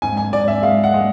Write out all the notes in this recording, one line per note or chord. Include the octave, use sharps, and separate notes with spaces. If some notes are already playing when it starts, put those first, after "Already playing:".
G#2 G#5
G#5
G#2 D5
E5
G#3 F5
F#5
G#3